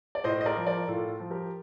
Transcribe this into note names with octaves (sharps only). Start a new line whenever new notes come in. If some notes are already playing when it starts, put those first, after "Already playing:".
D5
A2 C5 D#5
D#5
A#4 D5
F3
A#4 D5
A2 F4 A4
F3
G4 A#4